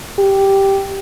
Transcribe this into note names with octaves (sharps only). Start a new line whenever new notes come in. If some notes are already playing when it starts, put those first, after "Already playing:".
G4